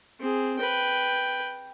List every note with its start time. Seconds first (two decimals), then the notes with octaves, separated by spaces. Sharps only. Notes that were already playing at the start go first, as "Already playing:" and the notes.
0.20 C4 G#4
0.58 B4 G5